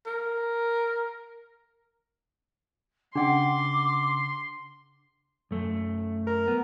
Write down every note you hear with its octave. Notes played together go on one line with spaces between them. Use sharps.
A#4
C#3 D4 F#5 G5 C6 D6
F#2 A3
A#4
B3